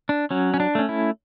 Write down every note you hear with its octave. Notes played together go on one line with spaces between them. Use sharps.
D4
F#3 C#4
C#4
D4
A3 C#4
E4